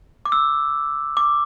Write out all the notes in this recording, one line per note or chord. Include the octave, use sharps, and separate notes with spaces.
D6
E6
D6